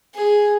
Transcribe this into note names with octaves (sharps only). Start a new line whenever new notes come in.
G#4